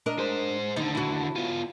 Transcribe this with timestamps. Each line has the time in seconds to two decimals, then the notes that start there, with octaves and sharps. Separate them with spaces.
0.06 D4 A#4 D#5
0.18 G#3 C5
0.76 D#2 D3 D#4
0.95 E4 F#4
1.36 B3 F4